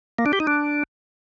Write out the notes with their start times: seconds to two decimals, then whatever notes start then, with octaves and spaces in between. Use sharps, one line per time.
0.18 A#3
0.26 D4
0.33 G4
0.40 D#4
0.47 D4